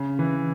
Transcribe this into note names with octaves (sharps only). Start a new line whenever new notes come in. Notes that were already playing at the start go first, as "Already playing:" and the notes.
Already playing: C#3
E3